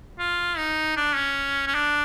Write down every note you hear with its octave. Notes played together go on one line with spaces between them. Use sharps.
F4
D#4
D4
C#4
C#4
D4